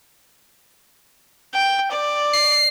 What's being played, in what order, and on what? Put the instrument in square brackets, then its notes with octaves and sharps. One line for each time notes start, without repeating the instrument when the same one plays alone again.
[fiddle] G5
D5
[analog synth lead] C7